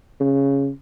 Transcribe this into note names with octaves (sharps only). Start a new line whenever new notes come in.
C#3